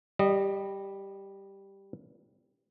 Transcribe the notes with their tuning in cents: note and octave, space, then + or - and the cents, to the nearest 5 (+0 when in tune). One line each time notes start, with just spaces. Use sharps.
G3 +0 D#5 -20